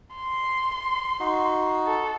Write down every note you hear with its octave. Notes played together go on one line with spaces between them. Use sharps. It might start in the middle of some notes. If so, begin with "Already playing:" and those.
C6
D#4 F#4
A4